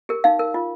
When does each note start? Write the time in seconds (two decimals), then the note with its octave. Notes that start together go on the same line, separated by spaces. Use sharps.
0.09 G4 A#4
0.24 D#4 F5
0.39 A#4
0.54 F4